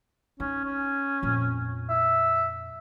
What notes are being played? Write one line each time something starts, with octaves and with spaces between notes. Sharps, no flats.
C#4 D#4
C#4
F2 A#2
E5